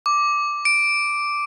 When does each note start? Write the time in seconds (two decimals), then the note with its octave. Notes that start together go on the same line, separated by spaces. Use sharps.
0.06 D6
0.65 D7